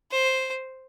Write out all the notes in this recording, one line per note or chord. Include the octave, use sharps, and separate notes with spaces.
C5